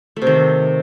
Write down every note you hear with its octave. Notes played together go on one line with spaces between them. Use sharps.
A3
C3
D#3